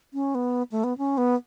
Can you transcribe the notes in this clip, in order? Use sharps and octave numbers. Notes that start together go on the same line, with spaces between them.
C#4
B3
A3
B3
C#4
B3